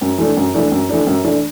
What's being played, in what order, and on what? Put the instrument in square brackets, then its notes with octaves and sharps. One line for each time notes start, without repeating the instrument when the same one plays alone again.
[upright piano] F#2
E3 A3 D4
F#2
E3 A3 D4
F#2
E3 A3 D4
F#2
E3 A3 D4